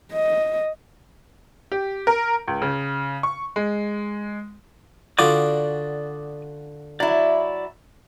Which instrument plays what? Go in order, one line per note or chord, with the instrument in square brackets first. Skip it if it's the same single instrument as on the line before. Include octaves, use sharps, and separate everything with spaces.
[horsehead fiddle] D#5
[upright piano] G4
A#4
C#2
C#3
C#6
G#3
[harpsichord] D3 F4 F#4 [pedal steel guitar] D5 D6 D#6
[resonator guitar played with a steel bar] F#3 E4 [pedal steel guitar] D5